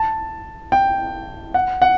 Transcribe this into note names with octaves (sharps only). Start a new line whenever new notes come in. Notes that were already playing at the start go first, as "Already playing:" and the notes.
Already playing: A5
G5
F#5
F#5